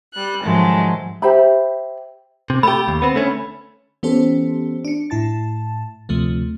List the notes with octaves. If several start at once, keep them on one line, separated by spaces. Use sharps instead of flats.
G3 F#6
G#2 D#3 F3 F#3 G#3 A3
G4 C5 E5 B5
C3
A3 G4 B5
D#2
B3 C4
D3 A3 C#4
E3 B3 C#4 G4 A4 C5
D4 C#7
A2 E4 A5 A6
D2 C3 F3 A3